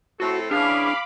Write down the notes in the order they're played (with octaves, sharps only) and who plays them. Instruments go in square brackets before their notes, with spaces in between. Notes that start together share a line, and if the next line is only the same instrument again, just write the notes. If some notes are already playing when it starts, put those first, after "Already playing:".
[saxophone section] A2 C4 A4 [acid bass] F#4
[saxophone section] E3 C#4 G#4 [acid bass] D4 [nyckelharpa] F5 [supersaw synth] B5 D6